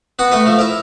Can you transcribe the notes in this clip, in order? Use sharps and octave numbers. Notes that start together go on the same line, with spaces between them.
B3 F#4 F#5
A3 F#4 B4
F3 A3
E4 A#4